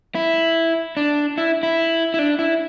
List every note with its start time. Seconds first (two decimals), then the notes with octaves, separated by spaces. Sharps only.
0.15 E4
0.97 D4
1.38 E4
1.63 E4
2.14 E4
2.19 D4
2.39 E4